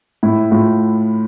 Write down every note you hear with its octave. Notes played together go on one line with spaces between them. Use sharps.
A2 E4
A2 F4